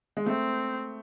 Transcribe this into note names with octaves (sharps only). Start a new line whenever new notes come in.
G#3
A3 C4